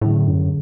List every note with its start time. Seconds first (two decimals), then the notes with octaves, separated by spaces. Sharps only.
0.01 A2 D3 F#3 C#4 G#4
0.28 F#2